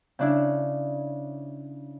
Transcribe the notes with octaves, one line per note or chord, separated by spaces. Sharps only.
C#3 D4 E4